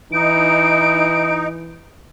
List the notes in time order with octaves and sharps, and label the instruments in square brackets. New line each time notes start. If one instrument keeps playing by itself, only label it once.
[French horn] E3 [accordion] D#4 [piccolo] D7